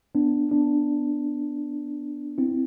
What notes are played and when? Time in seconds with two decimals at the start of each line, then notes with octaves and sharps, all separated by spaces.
0.15 B3 D4
0.52 B3 D4
2.38 C4 E4